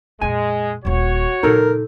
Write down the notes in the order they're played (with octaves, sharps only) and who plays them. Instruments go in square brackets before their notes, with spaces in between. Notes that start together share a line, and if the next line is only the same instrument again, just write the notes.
[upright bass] F2 A#2 [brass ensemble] G#3 [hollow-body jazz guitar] G#5
[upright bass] D#1 A#3 [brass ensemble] F#4 C#5
[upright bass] A#2 C#3 [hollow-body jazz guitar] D#4 A4 [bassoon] A#4